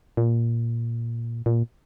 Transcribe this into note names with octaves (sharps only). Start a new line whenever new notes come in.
A#2
A#2